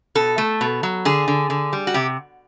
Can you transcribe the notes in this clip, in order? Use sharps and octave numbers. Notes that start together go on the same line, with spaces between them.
B2 A4
A3
B2
F#3
D3 G#4
D3
D3
G3
F#4
C3 G4